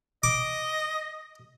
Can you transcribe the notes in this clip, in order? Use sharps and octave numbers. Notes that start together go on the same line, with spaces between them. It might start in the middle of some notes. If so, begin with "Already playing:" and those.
D#5 D6